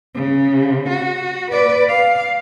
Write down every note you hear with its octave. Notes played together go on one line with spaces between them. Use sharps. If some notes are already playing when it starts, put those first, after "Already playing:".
C#3
F#4
B4 D5
F5